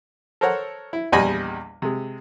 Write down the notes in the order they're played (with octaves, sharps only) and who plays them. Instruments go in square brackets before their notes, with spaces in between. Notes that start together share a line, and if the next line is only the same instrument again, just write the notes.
[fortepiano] A4 A#4 C5 C#5 F#5
E4
A#1 E2 G3 D#5 G#5 B5
C3 G#3